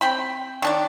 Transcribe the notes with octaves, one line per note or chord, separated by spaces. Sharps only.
C4 G5 B5
D#3 D4 D5